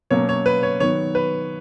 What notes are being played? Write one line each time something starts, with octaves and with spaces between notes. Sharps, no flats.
B2 F#3 A#3 C#4 C#5
C#5
B4
C#5
D#3 F#3 B3 C#5
B4